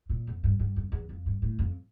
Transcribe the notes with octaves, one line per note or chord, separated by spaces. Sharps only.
A#2
F2
G2
G2
F2
E2
F2
G2
A2
F2